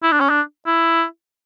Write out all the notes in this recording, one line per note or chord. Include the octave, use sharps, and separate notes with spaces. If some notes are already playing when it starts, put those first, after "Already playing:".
E4
D4
C#4
D4
E4